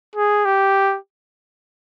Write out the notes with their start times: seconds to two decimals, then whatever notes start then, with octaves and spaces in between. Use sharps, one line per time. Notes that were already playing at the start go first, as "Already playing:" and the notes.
0.16 G#4
0.45 G4